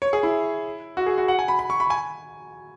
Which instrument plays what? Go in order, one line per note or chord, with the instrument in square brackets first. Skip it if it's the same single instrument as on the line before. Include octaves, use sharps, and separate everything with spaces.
[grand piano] C#5
G#4
E4
F#4
G#4
F#4
F#5
G#5
B5
B5
C#6
B5
G#5